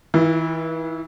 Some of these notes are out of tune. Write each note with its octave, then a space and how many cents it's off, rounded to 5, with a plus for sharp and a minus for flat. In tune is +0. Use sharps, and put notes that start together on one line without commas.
E3 -35 E4 +40